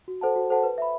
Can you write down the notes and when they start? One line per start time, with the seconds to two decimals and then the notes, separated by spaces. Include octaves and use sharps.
0.08 F#4
0.21 A4 C5 F#5 A5
0.36 F#4
0.50 A4 C5 F#5 A5
0.64 B4
0.78 E5 B5